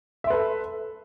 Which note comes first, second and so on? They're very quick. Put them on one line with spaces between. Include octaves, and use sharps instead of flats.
E5 C6 B4 A4